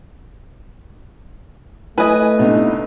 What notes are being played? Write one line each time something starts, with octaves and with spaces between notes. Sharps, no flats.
A3 E4 B4 D#5 G#5
C2 G2 B3 D#4